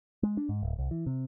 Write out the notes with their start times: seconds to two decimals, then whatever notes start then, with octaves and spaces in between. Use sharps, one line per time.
0.23 G#3
0.37 D4
0.49 G#2
0.63 D1
0.78 C2
0.91 E3
1.06 C3